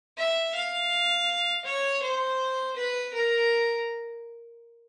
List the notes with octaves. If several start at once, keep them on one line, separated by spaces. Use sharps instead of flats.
E5
F5
C#5
C5
B4
A#4